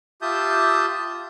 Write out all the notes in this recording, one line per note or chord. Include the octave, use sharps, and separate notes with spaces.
F4 G4 E5 A5 D#6 G6